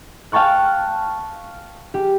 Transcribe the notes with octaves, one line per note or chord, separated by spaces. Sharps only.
F5 G5 A5 C#6 F#6
G4